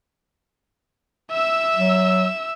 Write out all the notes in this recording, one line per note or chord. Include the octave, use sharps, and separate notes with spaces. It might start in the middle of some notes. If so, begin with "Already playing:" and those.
E5 E6
F#3